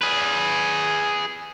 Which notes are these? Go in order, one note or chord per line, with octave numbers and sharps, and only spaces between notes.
G#4 B4